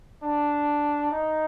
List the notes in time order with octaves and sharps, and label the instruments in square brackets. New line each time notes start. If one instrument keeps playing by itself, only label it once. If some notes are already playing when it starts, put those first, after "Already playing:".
[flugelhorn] D4
D#4